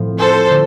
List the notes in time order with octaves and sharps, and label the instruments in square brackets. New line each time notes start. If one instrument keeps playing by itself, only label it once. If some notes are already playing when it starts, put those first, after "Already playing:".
Already playing: [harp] A2 F3 C4 F4
[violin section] A4 C5
[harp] D3